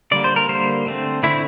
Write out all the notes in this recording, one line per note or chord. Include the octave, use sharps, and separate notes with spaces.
D3 G3 A#3 D5
C5
A#4
D3 G3 A#3 C5
D3 A3 C4
D3 A3 C4 E4